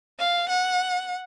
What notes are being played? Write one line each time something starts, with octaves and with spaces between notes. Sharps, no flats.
F5
F#5